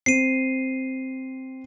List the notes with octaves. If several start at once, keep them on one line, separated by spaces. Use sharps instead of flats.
C4 C7 D#7